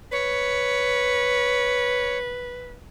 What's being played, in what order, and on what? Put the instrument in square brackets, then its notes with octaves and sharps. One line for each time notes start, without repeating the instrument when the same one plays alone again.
[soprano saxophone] B4 [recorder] C#5